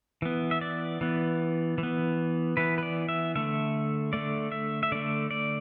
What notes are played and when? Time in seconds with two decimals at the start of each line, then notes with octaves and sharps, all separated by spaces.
0.22 E3 B3
0.51 E5
0.61 D5
1.01 E3 B3
1.78 E3
1.83 B3
2.57 E3 B3 B4
2.78 B4
2.83 D5
3.09 E5
3.35 D3 A3 E5
4.13 D3 A3 D5
4.52 E5
4.83 E5
4.92 D3 A3 D5
5.31 D5